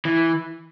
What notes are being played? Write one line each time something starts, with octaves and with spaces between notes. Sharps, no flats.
E3